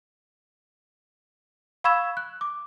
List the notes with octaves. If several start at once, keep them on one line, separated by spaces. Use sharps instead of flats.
F5 B5 C#6 E6 G#6 E7
F#6
D6